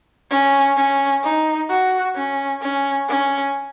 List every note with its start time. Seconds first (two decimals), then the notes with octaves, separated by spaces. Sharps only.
0.30 C#4
0.77 C#4
1.24 D#4
1.70 F#4
2.16 C#4
2.62 C#4
3.09 C#4